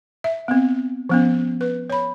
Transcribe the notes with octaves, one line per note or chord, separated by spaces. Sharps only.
E5
B3 C4
F3 B3 C#4
B4
C#5 B5